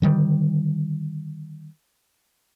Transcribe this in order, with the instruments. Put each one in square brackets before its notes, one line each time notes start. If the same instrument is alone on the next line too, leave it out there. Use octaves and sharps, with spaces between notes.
[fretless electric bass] D3 D#3 G3